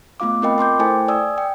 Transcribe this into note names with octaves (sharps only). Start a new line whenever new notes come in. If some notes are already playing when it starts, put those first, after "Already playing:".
A3 B3 F4 F5 D6
C4 F4 A#4 D#5 G5 B5
A#4 C6 D6 G6
A3 E4 A4 C5 G5 G#5
D5 G#5 D#6 E6
G5